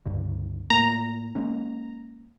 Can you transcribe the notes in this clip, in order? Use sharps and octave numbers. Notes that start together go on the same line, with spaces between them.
C#2 G2 D3
A2 A3 A#3 A#5
G#3 A#3 C#4